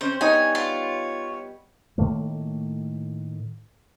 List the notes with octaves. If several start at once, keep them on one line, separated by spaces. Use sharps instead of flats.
C4 C#4 C5
G3 B3 D#4 C#5 G#5
F4
A2 D#3 A3 A#3